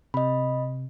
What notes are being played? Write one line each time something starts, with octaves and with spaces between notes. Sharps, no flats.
C3 D#5 B5